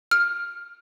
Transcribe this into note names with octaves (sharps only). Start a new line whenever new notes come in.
F6